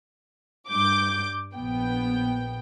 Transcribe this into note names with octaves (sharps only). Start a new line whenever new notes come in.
G2 D6 G6
A#1 B3 G5